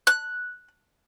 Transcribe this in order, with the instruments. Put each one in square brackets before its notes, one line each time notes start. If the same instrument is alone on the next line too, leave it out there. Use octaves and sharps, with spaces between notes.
[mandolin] F#6